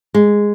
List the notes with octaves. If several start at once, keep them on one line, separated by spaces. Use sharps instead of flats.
G#3